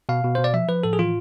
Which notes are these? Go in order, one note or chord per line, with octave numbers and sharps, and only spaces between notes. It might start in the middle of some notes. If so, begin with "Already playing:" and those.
B2 F5
B2
B2 C5
D5
F3 E5
F3 B4
A2 A4
G#4
E3 F4